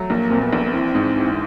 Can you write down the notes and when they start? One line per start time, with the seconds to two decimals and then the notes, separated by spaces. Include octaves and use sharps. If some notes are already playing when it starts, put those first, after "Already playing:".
Already playing: F#3 A3
0.10 A#1 A#3
0.30 A#2 C4
0.42 B3
0.53 A#1
0.67 B3
0.73 E3 C4
0.95 G#2
1.16 E3